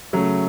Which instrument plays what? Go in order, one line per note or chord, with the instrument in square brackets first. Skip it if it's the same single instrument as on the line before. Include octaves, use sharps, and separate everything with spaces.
[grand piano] C#3 F#3 A3